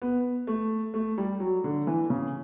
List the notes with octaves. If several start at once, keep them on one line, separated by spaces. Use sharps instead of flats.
B3
A3
A3
G3
F#3
D3
E3
C#3